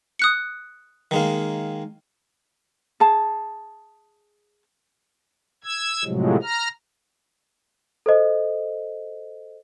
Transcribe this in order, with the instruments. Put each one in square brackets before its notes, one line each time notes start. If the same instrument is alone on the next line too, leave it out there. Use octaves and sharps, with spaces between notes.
[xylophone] D#6 F#6 C#7
[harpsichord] D#3 G#3 A#3
[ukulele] G#4 A5
[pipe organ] E6 G#6
A2 C3 F3 F#3 G#3
A#5 F6
[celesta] A4 C5 D#5